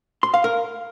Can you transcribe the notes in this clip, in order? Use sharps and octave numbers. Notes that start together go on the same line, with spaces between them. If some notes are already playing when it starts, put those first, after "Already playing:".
C6
F5
A#4